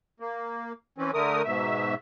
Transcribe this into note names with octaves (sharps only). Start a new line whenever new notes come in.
A#3
E3 C4 C#4
D3 A3 A#4 D#6
G#2 B2 E5